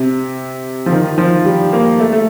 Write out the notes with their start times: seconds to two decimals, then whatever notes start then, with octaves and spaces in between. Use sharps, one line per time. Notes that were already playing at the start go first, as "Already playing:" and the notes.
Already playing: C3
0.86 F3
0.92 D#3
1.18 F3
1.45 G3
1.73 A#3
2.00 A3
2.12 A3